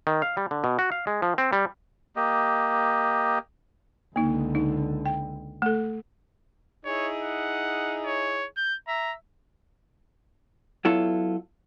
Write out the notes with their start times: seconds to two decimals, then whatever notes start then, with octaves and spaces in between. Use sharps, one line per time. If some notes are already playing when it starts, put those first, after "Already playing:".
0.07 D#3
0.22 F5
0.37 G3
0.51 D3
0.64 B2
0.79 F#4
0.92 F5
1.07 G#3
1.22 F3
1.38 C4
1.53 G3
2.16 A#3 G4 D#5
4.16 C#2 D3 A#3 D#4
4.55 D#4
5.06 G5
5.62 A3 A4
6.85 D#4 E4 G#4 C#5
7.23 F#5
8.05 C#5
8.57 G6
8.88 E5 A#5
10.85 F#3 B3 E4 F4 A4